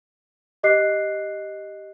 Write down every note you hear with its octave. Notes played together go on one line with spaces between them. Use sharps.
G4 D#5 D6 F#6 C7